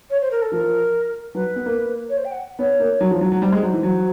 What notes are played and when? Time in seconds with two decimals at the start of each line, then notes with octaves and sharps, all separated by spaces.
0.10 C#5
0.21 C5
0.31 A#4
0.42 A4
0.52 F3 A#4
1.35 F#3 B4
1.56 B3
1.66 A#3
1.76 A#3
2.10 C#5
2.18 C5
2.25 G5
2.32 F#5
2.59 B3 C#5
2.80 A#3
3.01 F#3
3.11 F3
3.21 F#3
3.32 F#3
3.42 G3 C5
3.52 G#3
3.63 F#3
3.73 E3
3.83 F#3